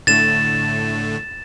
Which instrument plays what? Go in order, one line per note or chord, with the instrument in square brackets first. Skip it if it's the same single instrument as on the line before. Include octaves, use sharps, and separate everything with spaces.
[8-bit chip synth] A2 D3 A3 [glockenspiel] A6 E7